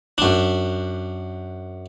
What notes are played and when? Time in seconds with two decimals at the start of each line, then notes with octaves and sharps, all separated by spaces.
0.18 F#2 D4